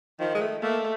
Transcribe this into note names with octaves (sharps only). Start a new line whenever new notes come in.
D#3 F3
G#3
A3
A3 A#3